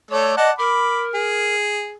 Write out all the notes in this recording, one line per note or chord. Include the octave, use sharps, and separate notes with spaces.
A3 A4 C#5 D5
D5 D#5 F#5 A5
A#4 B5 D6
G#4